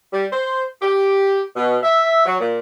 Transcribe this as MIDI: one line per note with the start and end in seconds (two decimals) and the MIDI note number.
0.13 0.26 55
0.33 0.62 72
0.82 1.41 67
1.56 1.77 47
1.83 2.22 76
2.26 2.40 54
2.40 2.59 46